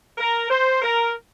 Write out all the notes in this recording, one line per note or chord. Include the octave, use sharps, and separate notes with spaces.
A#4
C5
A#4